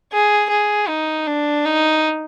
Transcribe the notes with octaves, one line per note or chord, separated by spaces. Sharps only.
G#4
G#4
D#4
D4
D#4